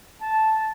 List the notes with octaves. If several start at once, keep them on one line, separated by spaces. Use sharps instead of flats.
A5